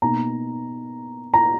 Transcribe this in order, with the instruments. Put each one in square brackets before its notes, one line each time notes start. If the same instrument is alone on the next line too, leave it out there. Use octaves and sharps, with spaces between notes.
[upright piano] B2 A#3 D#4 A#5
A#5